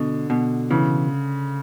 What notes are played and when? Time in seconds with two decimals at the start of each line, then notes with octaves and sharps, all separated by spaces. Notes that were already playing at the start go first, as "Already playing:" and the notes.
Already playing: B2 D3
0.30 B2
0.71 C#3 E3